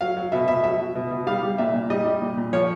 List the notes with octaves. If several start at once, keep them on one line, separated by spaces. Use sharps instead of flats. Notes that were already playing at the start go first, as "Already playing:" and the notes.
F#3 F5
F#3
B2 E5
B2 E5
F#3 E5
F#3
B2
B2
G3 F5
G3
A#2 E5
A#2
G3 D#5
G3
A#2
A#2
F3 C#5